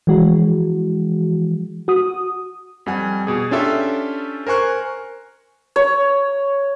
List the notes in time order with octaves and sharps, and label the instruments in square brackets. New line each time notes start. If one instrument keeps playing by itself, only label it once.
[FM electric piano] E3 F3 G#3 F#4
F#4 D#6
[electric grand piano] F2 G3 F#5 G#5
B2 G#4
C#4 D4 F4 G4 A4 E5
A#4 C5 G#5 C#6 F#6
[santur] C#5